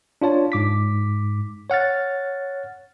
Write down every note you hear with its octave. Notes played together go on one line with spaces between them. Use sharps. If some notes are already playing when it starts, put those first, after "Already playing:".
D4 F4 C#5 A5
G#2 D6 B6
C#5 F#5 F6 A6